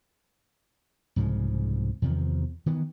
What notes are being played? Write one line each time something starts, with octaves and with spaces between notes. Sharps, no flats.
C2 G#2 C#3 F3
E2 C3 D#3 F3
D#3 E3 B3